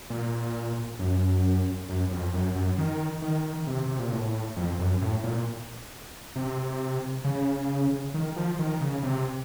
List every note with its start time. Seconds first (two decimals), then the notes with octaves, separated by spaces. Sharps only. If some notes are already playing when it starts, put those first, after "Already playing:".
0.10 A#2
0.99 F#2
1.89 F#2
2.11 F2
2.34 F#2
2.55 F#2
2.78 D#3
3.22 D#3
3.67 C3
3.86 C3
3.99 A#2
4.12 A2
4.56 F2
4.79 F#2
5.02 A2
5.24 A#2
6.36 C3
7.24 C#3
8.14 D#3
8.36 F3
8.59 D#3
8.81 C#3
9.03 C3